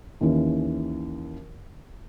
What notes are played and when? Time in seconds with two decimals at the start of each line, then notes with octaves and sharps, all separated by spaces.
0.21 D#2 E3 C#4